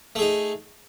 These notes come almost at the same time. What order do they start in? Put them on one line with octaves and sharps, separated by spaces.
A3 G#4 D#4